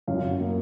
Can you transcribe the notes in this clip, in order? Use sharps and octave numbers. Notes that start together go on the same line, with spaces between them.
F#2 F5
A#3